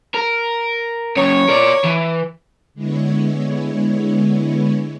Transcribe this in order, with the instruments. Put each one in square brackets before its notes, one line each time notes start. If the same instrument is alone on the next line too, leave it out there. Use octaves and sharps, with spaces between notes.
[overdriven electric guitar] A#4
[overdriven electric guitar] F#2 C#3 [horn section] C#5
[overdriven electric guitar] A#4 D5
E3
[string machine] D3 G#3 B3 E4 C#5